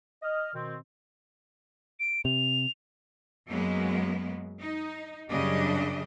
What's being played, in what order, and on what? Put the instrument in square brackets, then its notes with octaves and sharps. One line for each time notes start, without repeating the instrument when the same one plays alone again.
[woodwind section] D#5 F6
B2 D#3 C4
[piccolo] D7
[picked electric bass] C3 [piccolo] F7
[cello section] F#2 F#3 G#3 A#3 B3
D#4
F#2 C#3 G3 D4 G4 D#5